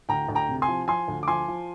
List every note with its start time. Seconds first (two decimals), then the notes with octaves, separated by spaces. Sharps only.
0.09 D2 G5 A#5
0.29 D2
0.35 G5 A#5
0.49 C3
0.62 G#5 C6
0.68 F3
0.88 F3 G#5 C6
1.08 D2
1.23 D6
1.28 F3 G#5 C6
1.48 F3